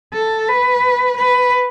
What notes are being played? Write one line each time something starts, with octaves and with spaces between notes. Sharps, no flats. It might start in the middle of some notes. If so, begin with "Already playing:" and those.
A4
B4
B4